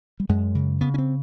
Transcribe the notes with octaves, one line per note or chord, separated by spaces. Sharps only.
G3
F#2 G#3
C#3
C#3 B3
C#4
C4